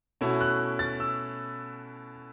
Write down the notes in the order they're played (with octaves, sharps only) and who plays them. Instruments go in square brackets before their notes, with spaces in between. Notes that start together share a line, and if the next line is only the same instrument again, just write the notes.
[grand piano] B2 A3 C#4 E4
F#6
A6
E6